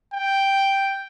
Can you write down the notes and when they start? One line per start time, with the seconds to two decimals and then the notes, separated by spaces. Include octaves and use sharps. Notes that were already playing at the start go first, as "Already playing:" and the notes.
0.14 G5